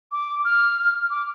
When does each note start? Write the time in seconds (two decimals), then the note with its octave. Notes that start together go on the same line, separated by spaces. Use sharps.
0.12 D6
0.45 F6
1.10 D6